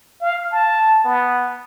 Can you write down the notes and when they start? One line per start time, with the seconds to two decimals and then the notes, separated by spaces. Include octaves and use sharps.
0.21 F5
0.52 A5
1.04 B3